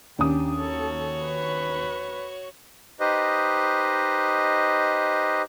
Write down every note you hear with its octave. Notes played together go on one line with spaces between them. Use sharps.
D#2 C#4 D4 G4 D#6
F#4 A4 C#5
B4
D#4 G4 B4 C5 D#5